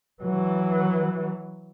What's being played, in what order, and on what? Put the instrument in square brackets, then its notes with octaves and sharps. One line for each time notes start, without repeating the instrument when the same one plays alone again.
[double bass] E3 F#3